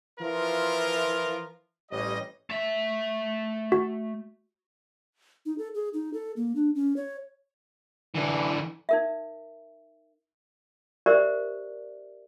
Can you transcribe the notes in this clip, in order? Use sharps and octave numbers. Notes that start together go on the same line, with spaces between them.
E3 F3 E4 F4 A#4
A1 G3 C#5 D#5
A3 E5
F#4
D#4
A4
G#4
D#4
A4
A#3
D4
C#4
C#5
D3 E3
D#4 A#4 E5
G4 A#4 C5 D5 E5